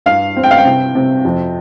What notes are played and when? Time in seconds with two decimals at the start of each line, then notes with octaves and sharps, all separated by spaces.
0.06 G2 F5
0.36 C4
0.43 G5
0.51 F5
0.58 G5
0.65 C3
0.95 C3
1.25 F2